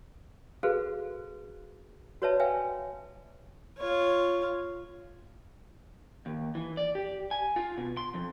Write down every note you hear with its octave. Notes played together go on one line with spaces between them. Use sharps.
F#4 G#4 A4 B4 C5 F5
F#4 B4 C#5 D5 E5 A5
B4 E5 F5 G5 G#5
F4 C#5
D#2
E3
D5
G4
G#5
F4
B2
C6
F2